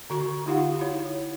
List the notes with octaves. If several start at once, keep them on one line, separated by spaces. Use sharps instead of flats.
D3 F#4 C#6
D#4 F4 G4 F5 F#5
E4 C#5